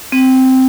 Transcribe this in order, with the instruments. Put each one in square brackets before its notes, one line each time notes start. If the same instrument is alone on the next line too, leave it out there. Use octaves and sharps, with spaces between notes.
[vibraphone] C4